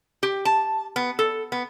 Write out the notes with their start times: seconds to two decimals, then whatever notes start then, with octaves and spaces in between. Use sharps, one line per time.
0.23 G4
0.45 A5
0.96 B3
1.19 A4
1.52 B3